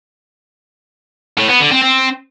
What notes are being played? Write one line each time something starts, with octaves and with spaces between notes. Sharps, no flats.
A2
B3
D3
C4
C4